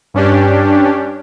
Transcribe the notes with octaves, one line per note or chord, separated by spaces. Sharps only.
G2 C#4 D4 G4